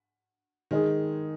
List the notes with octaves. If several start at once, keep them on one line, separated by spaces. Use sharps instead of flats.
D#3 G#3 D#4 G#4